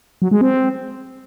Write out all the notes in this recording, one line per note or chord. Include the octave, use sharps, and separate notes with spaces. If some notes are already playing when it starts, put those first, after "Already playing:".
F#3
G#3
C4